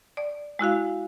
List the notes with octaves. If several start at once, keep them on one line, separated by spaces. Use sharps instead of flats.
D5
G#3 E4 F#4 F5